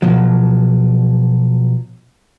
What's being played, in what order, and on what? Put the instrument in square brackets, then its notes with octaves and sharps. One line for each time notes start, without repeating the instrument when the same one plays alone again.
[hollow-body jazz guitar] B2 F3 F#3